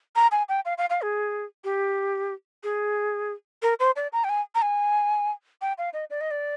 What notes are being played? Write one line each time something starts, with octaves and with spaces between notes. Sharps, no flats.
A#5
G#5
G5
F5
F5
F5
G#4
G4
G#4
A#4
C5
D5
A#5
G5
G#5
A#5
G#5
G5
F5
D#5
D5
D#5
D5